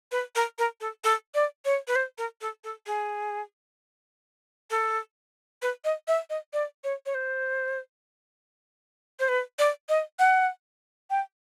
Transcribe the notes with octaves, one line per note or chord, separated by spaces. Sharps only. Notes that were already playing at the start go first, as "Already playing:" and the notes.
B4
A#4
A#4
A4
A4
D5
C#5
B4
C5
A#4
A4
A4
G#4
A4
B4
D#5
E5
D#5
D5
C#5
C#5
C5
C5
B4
D5
D#5
F#5
G5